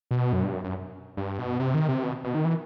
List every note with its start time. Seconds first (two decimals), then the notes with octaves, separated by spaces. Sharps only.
0.11 B2
0.33 F#2
0.43 G2
0.53 F#2
0.64 F#2
1.17 G2
1.39 B2
1.60 C3
1.74 D#3
1.89 C3
2.03 B2
2.24 B2
2.35 D#3
2.45 E3